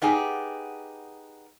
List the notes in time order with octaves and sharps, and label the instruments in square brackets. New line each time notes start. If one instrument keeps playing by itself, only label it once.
[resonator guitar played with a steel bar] B3 D#4 G4 G#4